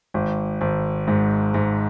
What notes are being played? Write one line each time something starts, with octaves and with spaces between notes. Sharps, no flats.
G#1
G#1
G#2
G#2